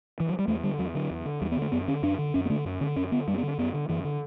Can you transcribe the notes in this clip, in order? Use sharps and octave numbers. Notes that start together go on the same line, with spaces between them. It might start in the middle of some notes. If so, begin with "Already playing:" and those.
E3
F#3
G3
E2 A3
D3 G3
E2 F#3
D3 F#3
E2
D3
E2 G3
B3
D3
A3
F#2 B3
D3 C#4
F#2 D4
D3
F#2 C#4
B3
D3 A3
F#2
D3 C#4
F#2 C#4
D3 B3
F#2 G3
C#4
B3
D3
C#4
F#2 B3
D3
F#2 E3
D3